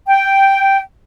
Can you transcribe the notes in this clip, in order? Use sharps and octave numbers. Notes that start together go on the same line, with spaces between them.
G5